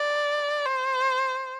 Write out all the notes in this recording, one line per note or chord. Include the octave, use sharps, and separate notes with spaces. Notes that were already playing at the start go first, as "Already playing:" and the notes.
Already playing: D5
C5